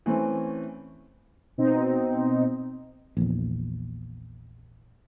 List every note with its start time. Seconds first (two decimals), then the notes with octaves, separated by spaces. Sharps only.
0.06 E3 A3 C4 C#4
1.58 B2 C4 D#4
3.17 A#1 E2